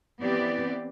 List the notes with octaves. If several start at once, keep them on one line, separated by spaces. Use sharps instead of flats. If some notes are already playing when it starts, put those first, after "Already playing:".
E3 B3 C4 G4 B4 D5